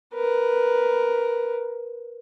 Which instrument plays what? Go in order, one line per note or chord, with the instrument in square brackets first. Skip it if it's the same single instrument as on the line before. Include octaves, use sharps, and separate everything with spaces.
[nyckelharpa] A#4 B4